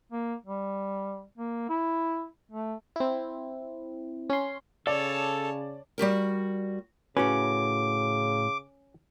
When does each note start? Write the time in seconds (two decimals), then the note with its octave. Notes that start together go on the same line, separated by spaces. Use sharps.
0.12 A#3
0.46 G3
1.38 A#3
1.69 E4
2.51 A3
2.96 C4 E4
4.30 C#4 C6
4.87 C#3 A4 C#5 D5 A5
5.98 G3 F#4 G4 A#4
7.17 A2 C#3 C#4 F#4 B4 D6